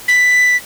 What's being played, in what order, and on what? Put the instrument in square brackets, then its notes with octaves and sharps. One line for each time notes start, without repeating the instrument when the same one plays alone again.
[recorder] B6